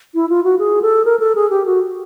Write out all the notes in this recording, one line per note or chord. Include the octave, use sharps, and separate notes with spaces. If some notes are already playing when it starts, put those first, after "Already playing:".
E4
F4
F#4
G#4
A4
A#4
A4
G#4
G4
F#4